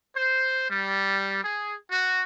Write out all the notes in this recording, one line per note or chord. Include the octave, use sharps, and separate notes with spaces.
C5
G3
G#4
F#4